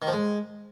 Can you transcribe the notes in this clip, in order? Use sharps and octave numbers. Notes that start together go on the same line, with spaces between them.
D#3
F3
G#3